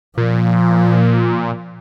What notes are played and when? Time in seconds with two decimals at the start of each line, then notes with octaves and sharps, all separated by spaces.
0.18 A#2 F3